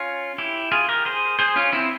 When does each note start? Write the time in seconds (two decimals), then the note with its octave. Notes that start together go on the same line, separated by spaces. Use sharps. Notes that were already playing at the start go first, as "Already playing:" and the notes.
Already playing: C#4 F4
0.38 E4 G4
0.72 F4 G#4
0.88 G4 A#4
1.05 G#4 C5
1.39 G#4 C5
1.56 C#4 F4
1.73 C4 E4